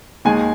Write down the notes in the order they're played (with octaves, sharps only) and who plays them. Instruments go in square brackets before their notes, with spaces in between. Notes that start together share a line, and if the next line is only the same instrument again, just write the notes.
[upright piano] D#2 D#3 G#3 G#5